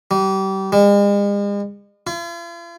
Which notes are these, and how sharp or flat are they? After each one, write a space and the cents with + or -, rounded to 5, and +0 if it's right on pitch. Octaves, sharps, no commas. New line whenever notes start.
G3 -30
G#3 -45
F4 -45